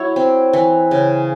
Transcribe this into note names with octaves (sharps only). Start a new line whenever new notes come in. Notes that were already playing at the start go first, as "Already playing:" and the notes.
Already playing: F#3 E4 C#5
C4
E3
C#3